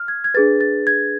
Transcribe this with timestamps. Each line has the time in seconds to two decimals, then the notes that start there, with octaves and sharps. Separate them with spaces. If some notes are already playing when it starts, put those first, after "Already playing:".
Already playing: F6
0.08 G#6
0.24 G#6
0.34 D4 G#4 B4 A6
0.61 A6
0.87 G#6